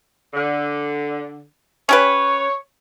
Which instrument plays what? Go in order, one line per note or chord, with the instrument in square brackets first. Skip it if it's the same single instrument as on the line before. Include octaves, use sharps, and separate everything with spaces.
[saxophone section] D3
[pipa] C#4 G4 B4 [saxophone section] C#5